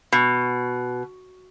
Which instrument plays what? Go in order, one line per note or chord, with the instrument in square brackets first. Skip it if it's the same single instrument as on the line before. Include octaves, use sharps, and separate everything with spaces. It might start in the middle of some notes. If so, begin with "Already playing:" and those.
[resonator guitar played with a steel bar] B2